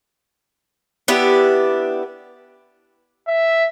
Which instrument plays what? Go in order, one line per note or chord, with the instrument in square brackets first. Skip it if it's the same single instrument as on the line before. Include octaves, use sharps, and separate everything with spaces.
[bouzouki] B3 D4 E4 G4
[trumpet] E5